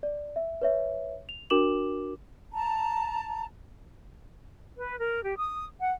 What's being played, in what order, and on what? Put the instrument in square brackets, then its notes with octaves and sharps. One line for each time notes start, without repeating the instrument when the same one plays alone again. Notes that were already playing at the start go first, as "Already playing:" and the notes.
[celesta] D5
E5
B4 C#5 E5
F7
D4 F#4 A#4 D6 E7 F#7
[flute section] A5 A#5
B4
A#4
G4
D#6
F#5